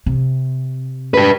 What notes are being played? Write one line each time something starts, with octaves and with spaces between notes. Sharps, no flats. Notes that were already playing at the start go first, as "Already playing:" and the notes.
C3
G4 B4